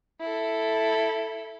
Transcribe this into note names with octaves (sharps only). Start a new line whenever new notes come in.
E4 A4